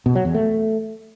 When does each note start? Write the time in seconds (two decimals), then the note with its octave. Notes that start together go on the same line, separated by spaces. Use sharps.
0.06 B2
0.15 F#3
0.25 E2
0.34 A3